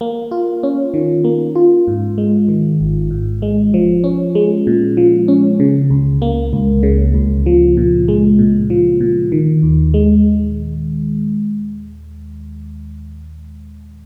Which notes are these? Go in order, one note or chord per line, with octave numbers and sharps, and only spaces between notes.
A#3
F4
C#4
D#3
A#3
F4
G#2
G#3
D#3
G#1
G#2
G#3
F3
C#4
G#3
A#2
F3
C#4
C#3
C#2
A#3
C#2
C#3
C#2
F3
A#2
G#3
A#2
F3
A#2
D#3
D#2
G#3